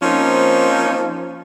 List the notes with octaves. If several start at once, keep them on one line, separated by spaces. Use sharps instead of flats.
F3 A#3 C4 C#4 D#4